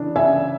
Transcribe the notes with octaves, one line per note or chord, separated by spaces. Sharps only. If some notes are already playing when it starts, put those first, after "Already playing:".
Already playing: C#3 E3 D4
C#3 E5 G#5